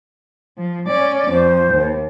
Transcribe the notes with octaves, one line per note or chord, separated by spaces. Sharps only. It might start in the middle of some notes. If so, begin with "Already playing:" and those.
F3
C#4 D5
F2 C5
D#2